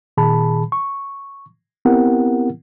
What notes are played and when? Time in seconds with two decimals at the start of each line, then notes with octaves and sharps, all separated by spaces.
0.17 A#2 D#3 G#4 A5 B5
0.72 C#6
1.85 B3 C4 E4 G4 A#4 F#5